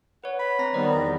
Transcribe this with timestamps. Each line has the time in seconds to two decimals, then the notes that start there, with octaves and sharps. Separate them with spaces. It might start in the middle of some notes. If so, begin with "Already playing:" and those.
0.24 B4 C#5 F#5
0.39 B5
0.59 C4 A#5 A#6
0.74 D#3 G3 B3 C5 D5
0.91 E2 A#5